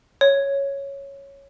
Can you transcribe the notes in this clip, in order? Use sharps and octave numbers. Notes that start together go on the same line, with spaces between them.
C#5